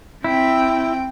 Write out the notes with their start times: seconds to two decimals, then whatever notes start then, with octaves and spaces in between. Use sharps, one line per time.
0.24 C4 E4 G5